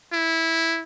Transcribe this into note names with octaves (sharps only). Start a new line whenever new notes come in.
E4